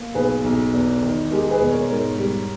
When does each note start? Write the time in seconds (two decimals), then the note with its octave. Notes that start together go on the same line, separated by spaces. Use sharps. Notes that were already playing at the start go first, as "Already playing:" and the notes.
Already playing: A#3
0.15 B1 G#4 B4
0.44 B1
0.73 E2
1.03 D#3
1.31 G#3 G4 A#4
1.51 G#4 B4
1.61 E1
1.71 A#4 C#5
1.89 G#2 A#4 C#5
2.19 G3